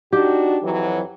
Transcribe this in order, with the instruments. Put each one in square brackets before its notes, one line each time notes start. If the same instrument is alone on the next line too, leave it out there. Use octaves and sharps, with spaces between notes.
[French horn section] D4 D#4 F#4 [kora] G4
[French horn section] F2 E3 F#3